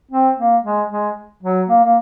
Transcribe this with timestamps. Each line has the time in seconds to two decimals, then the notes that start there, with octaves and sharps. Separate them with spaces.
0.12 C4
0.38 A#3
0.64 G#3
0.90 G#3
1.43 F#3
1.69 A#3
1.84 A#3